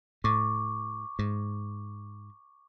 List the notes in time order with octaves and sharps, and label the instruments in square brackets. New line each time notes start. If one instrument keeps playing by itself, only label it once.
[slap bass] A2 [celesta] C#6 D6
[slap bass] G#2